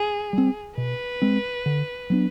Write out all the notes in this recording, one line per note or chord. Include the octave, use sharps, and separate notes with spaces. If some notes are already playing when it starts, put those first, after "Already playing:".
Already playing: G#4
G3 C4
B2 B4
G#3 C4
D3
F#3 B3 D4